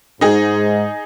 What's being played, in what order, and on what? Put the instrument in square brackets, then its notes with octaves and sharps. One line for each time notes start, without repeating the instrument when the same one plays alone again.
[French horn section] G#2 [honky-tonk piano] D#4 G#4